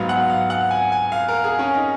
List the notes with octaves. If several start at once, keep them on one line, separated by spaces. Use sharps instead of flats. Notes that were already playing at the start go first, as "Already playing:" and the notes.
Already playing: G#2 F#3 B3 F5
F#5
F5
F#5
G#5
G#5
F5
A#4
G#4
C#4
D#4